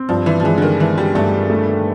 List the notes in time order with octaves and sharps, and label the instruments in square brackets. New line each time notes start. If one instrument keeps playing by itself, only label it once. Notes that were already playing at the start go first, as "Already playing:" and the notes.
Already playing: [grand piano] C4
[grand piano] G2 [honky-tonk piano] F3
[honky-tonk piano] E3
F3
[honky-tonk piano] E3 [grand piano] G#3
[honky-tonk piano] D3
D#3
[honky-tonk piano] E3 [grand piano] G#3
[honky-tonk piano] G3
[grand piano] G2 [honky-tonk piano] A3
[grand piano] A3